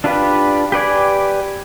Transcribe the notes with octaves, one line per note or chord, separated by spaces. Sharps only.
D4 F4 G4 B4
G4 B4 D5 G#5